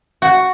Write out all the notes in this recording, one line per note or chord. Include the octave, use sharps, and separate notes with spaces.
F#4